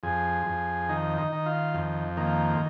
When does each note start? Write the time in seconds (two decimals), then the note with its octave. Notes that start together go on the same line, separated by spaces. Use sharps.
0.03 F2 G#4
0.47 F2
0.89 D#3 D#4
1.17 D#4
1.32 D#3
1.46 F4
1.74 F2
2.17 D#3 A#3